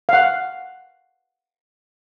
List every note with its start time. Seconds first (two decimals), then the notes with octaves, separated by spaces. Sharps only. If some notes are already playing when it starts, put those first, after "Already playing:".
0.09 F5 F#5